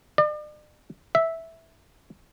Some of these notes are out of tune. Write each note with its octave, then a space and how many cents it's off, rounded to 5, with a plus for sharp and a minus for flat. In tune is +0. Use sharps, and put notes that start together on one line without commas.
D5 +40
E5 -5